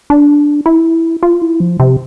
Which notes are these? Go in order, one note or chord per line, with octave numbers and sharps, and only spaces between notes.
D4
E4
F4
E4
F3
C3